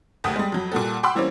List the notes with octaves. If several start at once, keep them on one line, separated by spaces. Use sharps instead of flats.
F#1 D2 G4 F#5 D#6 B6
G3 G#3
F2 F#3
A#2 G3 F#4 A4
F#5 G5 B5 C6 D6 E6
E3 G3 A#3 C4 C#4